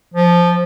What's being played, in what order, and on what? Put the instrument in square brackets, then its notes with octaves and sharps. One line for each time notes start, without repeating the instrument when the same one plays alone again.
[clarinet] F3